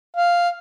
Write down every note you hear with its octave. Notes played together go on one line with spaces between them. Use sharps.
F5